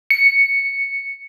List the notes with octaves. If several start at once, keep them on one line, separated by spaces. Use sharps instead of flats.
C#7